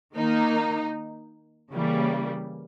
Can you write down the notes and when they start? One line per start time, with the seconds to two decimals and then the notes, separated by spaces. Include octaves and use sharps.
0.16 D#3 A#3 D#4
1.73 C#3 E3 G3 A#3